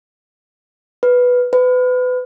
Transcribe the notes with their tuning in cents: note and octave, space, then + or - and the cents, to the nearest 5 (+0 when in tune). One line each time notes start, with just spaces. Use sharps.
B4 +0
B4 +30